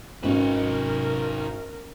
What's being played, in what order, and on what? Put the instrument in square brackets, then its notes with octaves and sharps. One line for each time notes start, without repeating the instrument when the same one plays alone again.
[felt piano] G#1 [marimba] C#4 [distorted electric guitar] D#4 B4 [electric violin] A#4